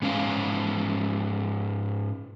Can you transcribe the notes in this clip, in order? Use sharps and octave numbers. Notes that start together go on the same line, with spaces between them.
G#2 C#4 B4 F5